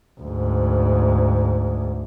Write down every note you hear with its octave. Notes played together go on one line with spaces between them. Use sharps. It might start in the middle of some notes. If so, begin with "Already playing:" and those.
D2 G#2